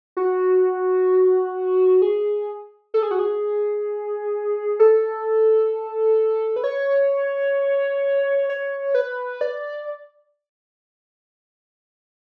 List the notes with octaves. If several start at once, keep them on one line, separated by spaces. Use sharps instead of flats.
F#4
G#4
A4
G#4
F#4
G#4
A4
B4
C#5
C#5
B4
D5